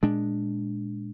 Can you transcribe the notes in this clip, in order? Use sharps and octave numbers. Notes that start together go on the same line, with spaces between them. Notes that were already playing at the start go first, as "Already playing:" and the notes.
A#2 G#3 D4